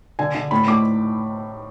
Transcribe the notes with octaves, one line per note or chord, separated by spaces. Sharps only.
D3 G#5
D3
A2 B5
A2 D6